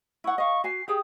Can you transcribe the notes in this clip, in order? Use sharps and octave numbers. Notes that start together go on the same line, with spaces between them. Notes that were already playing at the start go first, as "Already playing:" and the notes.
E4 F#5 C#6
D#5 F5 C#6
F#4 G#5 C7
G4 G#4 G5 D#6